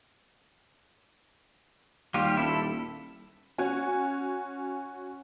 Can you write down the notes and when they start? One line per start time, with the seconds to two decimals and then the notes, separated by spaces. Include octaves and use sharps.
2.14 D#2 G3 F4 G4
2.37 D#1 E4 A4
3.58 C#4 F#4 G#5